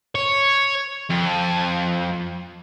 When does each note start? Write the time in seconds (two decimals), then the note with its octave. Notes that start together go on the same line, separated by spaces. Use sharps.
0.15 C#5
1.10 F2